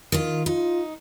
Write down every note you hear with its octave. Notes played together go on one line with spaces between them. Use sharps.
D#3 F4
D#4 F4